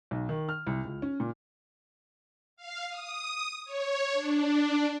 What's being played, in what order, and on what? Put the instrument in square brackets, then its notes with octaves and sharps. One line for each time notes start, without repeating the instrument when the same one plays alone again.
[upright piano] B1
D#3
F6
C2
C#2
C#4
A#2
[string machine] F5
D#6
C#5
D4